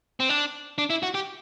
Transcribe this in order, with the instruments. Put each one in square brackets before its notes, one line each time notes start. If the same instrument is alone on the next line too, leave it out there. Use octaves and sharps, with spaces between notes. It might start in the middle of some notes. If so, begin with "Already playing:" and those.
[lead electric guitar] C4
D4
D4
E4
F#4
G4